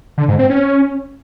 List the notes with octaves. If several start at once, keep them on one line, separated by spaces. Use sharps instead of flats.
D3
G#2
C4
C#4